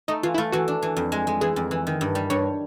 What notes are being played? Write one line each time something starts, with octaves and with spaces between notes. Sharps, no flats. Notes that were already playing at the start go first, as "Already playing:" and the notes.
A3 D#4
E3 F4
E4
A3 F4
E3 F#4
D4
E3
F2
G#3
G#3
E3 G#4
F2
E3
D#3
G2
G3
G2 C#5